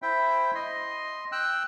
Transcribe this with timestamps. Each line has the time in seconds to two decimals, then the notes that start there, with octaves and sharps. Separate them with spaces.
0.02 E4 C5 E5 G5
0.55 D#5 C6
1.32 G5 E6 F#6